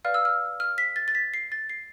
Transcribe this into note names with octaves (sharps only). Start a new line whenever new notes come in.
B4 D5 F5 F6
E6
F6
F6
B6
A6
A6
B6
C7
A6
C7